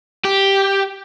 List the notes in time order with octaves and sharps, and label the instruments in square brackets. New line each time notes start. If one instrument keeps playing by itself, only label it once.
[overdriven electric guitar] G4